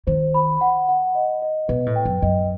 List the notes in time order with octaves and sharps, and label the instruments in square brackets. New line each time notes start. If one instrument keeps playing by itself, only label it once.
[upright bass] D#3 [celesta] C5
[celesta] B5
F#5
F#5
D#5
D#5
[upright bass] B2 [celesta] B4
[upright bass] A2
[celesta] G5
[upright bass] F#2
[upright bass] F#2 [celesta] D#5